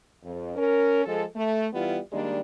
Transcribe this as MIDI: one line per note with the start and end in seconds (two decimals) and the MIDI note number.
0.23 0.54 41
0.55 1.03 61
0.55 1.03 70
1.05 1.24 53
1.05 1.24 56
1.05 1.24 69
1.35 1.67 57
1.73 1.98 52
1.73 1.98 55
1.73 1.98 59
1.73 1.98 64
1.73 1.98 65
2.11 2.41 51
2.11 2.41 55
2.11 2.41 56
2.11 2.41 58
2.11 2.41 62